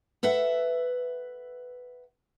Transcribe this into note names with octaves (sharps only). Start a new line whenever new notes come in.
A4 B4 E5 F#5